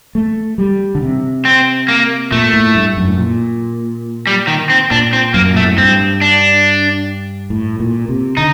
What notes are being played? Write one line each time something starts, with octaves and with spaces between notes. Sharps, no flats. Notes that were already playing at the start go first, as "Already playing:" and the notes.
A3
G3
D3
C3
C4
A#3
A#2 A3
A2
G2
F#2
A2
A#2
G3
D#3
C4
A#2 D4
C4
F#2 A#3
A#2 A3
A2
G2 C4
D4
A2
A#2
C3
D3 D#4